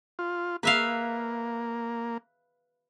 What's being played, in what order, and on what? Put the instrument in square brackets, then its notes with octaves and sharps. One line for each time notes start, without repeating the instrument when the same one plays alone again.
[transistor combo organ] F4
[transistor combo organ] A#3 [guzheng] B4 E5 F5